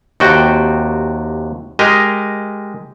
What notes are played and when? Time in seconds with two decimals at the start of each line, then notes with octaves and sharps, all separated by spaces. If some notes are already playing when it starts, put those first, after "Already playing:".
0.20 D#2 C3 F#4 G5
1.79 G#3 G4 A#4 D#5